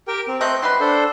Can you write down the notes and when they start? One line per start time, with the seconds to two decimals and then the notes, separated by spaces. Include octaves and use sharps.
0.08 G4 A#4 G5
0.28 C4
0.41 A3 C4 D#5 F#6 G6
0.62 F#3 G3 B4 C6
0.80 D4 A4 C5